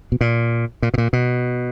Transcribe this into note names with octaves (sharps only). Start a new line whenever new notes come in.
B2
A#2
A#2
B2
A#2
B2